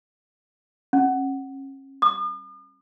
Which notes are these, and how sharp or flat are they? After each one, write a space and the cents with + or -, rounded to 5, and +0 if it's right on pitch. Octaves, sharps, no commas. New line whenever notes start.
C#4 -35
D#6 -45